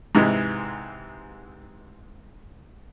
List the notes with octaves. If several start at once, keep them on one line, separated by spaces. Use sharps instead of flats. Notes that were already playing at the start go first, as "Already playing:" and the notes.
G#2 C3 E3 G#3